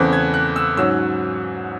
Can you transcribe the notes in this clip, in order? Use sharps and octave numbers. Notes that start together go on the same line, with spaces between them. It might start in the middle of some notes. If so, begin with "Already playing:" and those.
Already playing: E2 C#3 E3 A3 C4 F#6
G#6
F#6
E6
G#2 F#3 C#4 E6